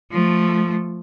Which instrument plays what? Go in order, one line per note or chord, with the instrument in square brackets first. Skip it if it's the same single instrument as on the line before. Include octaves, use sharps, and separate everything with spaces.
[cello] F3 A3